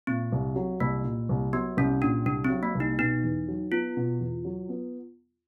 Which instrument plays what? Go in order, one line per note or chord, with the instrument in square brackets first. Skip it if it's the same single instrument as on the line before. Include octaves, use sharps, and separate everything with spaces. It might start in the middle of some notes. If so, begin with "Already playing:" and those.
[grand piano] A#2 [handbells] C4
[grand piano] C2
F#3
[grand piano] C2 [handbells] A#3
[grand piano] A#2
C2
[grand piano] F#3 [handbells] B3
[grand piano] C2 [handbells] C#4
[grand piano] A#2 [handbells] D4
[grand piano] C2 [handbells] D4
[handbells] C4
[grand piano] F#3
[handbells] A#3
[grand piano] C2
[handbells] D#4
[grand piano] B2 [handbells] D#4
[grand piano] E2
F#3
[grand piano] B3 [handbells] F4
[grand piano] B2
E2
F#3
B3